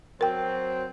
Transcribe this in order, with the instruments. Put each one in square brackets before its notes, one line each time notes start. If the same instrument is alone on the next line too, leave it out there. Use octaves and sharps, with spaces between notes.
[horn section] F#3 C4 [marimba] A#4 G5